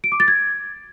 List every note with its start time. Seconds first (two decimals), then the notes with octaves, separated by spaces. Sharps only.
0.04 D7
0.12 D6
0.20 A6
0.28 G#6